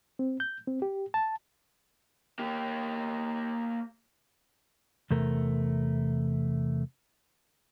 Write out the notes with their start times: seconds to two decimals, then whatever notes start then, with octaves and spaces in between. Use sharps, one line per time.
0.19 C4
0.40 G6
0.67 C4
0.82 G4
1.14 A5
2.39 A#3 G4
5.11 E2 C3 A3 A#4